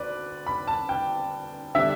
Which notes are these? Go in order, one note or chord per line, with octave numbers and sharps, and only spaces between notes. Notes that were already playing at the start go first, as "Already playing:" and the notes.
Already playing: D2 B4 D5
B5
A5
G5
D3 G3 D4 E5